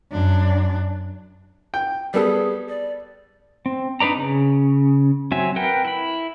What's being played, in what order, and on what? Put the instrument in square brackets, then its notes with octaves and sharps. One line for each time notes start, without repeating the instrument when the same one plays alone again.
[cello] F#2 D4
[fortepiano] G5
[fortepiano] G3 B3 A4 [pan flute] G#4
[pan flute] D5
[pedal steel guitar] C4
D4 D#4 B4 D5 A#5
C#3
F#3 C4 E5 G#5
A#4 B4 F#5 G5
E4 B5